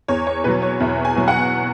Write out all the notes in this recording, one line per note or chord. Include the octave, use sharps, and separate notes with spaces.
E2 C#5
C#5
B2 F#3 B4
C#5
E2 E5
G#5
B2 F#3
F#5